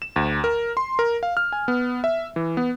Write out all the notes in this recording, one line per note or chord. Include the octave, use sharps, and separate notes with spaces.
E7
D2
A#4
C6
A#4
F5
F6
G#5
B3
E5
E3
B3